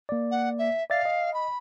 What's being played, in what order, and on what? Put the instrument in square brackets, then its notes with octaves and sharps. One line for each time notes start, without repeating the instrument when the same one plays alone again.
[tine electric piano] A#3 D5
[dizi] F#5
E5
[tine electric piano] D5 E5 A6 [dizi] F5
[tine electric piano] D#5
[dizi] B5